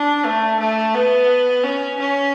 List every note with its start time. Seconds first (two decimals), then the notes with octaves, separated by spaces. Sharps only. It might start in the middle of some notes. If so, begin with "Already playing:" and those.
Already playing: D4
0.25 A3
0.60 A3
0.95 B3
1.64 C#4
2.00 C#4